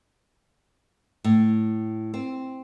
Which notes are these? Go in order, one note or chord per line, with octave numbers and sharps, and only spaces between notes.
A2
C4